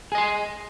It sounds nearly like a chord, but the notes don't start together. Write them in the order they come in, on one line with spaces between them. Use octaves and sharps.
G#4 D#5 C6